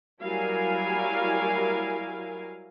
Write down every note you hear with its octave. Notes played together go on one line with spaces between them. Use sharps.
F#3 G3 E4 A#4 F5 G#5